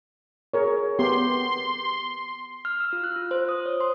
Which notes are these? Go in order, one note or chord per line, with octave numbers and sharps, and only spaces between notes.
G#4 A#4 C#5
B3 G4 C6
F6
E6
F4
F#6
F4
C5
D#6
C#5
C6